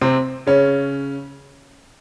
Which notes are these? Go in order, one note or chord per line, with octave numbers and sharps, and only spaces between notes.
C3 C4
C#3 C#4